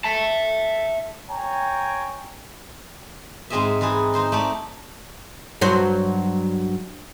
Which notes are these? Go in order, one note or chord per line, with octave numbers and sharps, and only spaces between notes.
E5 A5
C#5 G5 G#5 A#5
G#2 G#3 C4 G#4 D#5 E5
E3 G#3 D#4 G#4
D#4 C5 C6
A3 D#4 D5
G2 F#3 C5